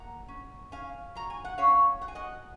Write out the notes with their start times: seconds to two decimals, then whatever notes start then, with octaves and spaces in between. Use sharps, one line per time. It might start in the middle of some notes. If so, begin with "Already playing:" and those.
Already playing: A#3 F#5 A#5
0.28 C#4
0.72 C#4 F5 G#5
1.15 F#3 A#5
1.30 G#5
1.45 F#5
1.58 C#4 C#5 F5
2.01 F#3 F#5
2.08 G#5
2.15 D#5 F#5